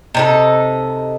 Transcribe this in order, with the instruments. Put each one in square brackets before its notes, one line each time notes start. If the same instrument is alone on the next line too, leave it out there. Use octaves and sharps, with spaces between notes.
[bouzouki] C3 D#4 A4